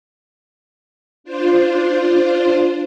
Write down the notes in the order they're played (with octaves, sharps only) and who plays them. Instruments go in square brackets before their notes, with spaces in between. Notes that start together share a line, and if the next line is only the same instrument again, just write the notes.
[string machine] D4 F4 C5